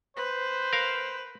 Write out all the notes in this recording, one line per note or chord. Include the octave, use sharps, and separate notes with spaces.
B4 C5
A#4 F5